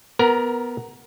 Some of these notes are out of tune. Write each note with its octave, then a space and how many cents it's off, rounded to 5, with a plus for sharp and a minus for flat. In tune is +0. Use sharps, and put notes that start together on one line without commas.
B3 +0 A#4 +0 A#5 +30